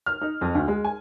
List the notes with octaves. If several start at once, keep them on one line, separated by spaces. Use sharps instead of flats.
F6
D#4
F2
D2
G#3
G#5